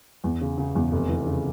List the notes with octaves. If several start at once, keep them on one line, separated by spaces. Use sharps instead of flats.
E2
C#3
C#3
E2
F1
E3
C#3